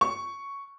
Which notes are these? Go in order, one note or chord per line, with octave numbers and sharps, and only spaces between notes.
C#6